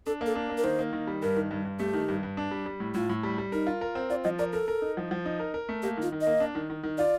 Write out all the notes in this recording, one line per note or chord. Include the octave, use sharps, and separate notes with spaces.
D4 A4
A#3
A4
D4
A#3
A#4
D#3 C5
A#3
D#3
G3
G2 A#4
D#3
G2
G2
A3 G4
D#3
G2
G2
D4
G3
G3
A2
A2 F4
A2
G3
G3
D#4 A#4
F4
A#4
C4
F4 D5
F3 D#5
A#4 D5
A4 A#4
A#4
D#4
F3
F3
D#4
A#4
A#4
A3
A#3 G4
D#3 F4
D#3
D#5
A#3
D4
D#3
D#3
D#3
F4 D5